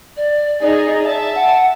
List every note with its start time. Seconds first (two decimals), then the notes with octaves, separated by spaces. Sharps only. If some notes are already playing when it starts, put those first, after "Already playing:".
0.16 D5
0.61 D#4 G#4 D5 D#5
1.01 E5 A5
1.34 F#5